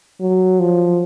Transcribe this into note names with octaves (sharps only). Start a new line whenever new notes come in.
F#3
F3